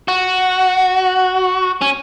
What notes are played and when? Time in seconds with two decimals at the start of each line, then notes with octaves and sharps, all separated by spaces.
0.08 F#4
1.81 C#4